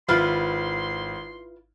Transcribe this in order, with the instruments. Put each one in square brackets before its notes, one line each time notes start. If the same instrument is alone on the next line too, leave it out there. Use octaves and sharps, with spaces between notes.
[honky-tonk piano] G#1 [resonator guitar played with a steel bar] E4 F4 B4 [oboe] C6